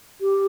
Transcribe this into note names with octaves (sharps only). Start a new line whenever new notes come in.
G4